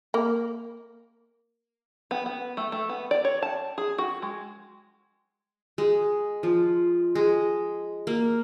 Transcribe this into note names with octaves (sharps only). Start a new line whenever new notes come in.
A#3
B3
B3
A3
A3
B3
D5
C#5
A5
G#4
F#4
G#3
G#3
F3
G#3
A#3